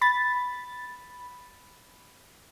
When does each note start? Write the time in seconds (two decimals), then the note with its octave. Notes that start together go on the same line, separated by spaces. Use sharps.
0.02 B5 A6